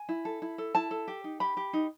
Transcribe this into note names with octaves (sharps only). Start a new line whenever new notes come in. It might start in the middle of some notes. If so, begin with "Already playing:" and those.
Already playing: G#5
E4
A4
E4
A4
E4 A5
A4
G4
D#4
G4 B5
G4
D#4